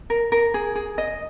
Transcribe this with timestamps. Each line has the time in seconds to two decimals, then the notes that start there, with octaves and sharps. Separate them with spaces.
0.10 A#4
0.32 A#4
0.54 G#4
0.75 G#4
0.98 D#5